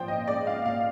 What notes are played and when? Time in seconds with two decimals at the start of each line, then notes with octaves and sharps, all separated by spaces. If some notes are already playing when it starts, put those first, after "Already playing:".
Already playing: A#2 F3 C5 G5
0.08 D#5
0.28 G#3 D5
0.47 F5
0.66 A#2 F5